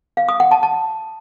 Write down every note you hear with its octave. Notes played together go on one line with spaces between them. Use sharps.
F5
D#6
F#5
A5
A5